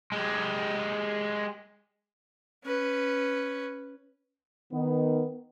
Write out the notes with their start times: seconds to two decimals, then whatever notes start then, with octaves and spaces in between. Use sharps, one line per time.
0.12 G#3 G4
2.64 C#4 B4
4.73 D#3 B3